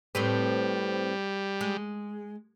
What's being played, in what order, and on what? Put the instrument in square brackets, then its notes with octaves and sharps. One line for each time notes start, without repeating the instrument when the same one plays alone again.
[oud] A2 C4 B4 [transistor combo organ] G3
[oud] G#3